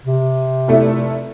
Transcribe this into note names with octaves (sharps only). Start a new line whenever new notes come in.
C3
F1 A3 E4